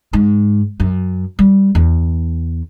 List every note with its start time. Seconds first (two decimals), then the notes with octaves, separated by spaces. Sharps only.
0.13 G#2
0.80 F#2
1.39 G3
1.75 E2